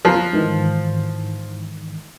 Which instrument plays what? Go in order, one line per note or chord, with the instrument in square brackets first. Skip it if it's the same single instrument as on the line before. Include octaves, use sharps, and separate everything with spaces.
[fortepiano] F3 [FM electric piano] A#5 C6 F#6
[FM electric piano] G#2 D#3 E3